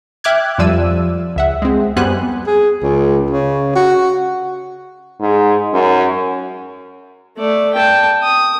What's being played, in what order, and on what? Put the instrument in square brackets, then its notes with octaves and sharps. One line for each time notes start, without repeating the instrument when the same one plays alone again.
[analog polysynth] E5 G5 D6 F6 F#6 G#6
F2 F3 G3 D5 E6 D#7
C#2 E5 F#5
G#3 C4
F#2 G3 B3 C5 G#5 F#6
[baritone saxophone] G#4
C#2
C#3
F#4
[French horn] G#2
F#2
[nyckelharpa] A3 D5
G5 A5
D#6